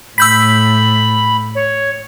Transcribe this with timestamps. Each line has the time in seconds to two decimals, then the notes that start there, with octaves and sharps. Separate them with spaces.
0.18 A2 B5 E6 G6 B6
1.55 C#5